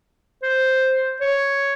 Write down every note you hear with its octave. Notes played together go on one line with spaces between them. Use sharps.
C5
C#5